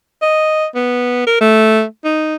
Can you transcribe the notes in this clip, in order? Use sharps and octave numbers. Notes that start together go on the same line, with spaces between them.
D#5
B3
A#4
A3
D#4